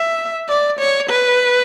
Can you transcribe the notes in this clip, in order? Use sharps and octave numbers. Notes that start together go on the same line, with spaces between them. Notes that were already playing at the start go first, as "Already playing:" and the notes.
Already playing: E5
D5
C#5
B4